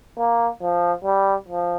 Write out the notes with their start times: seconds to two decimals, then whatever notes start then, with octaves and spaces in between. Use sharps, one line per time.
0.18 A#3
0.62 F3
1.05 G3
1.49 F3